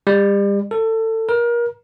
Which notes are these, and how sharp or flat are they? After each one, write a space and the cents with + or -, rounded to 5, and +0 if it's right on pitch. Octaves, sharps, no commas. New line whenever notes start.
G3 +35
A4 +25
A#4 +30